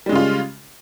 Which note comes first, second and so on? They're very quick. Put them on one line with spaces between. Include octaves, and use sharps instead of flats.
G3 G#3 C#3 F4